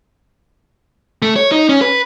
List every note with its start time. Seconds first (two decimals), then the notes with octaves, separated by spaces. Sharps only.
1.22 A3
1.36 C#5
1.52 D#4
1.69 C#4
1.81 B4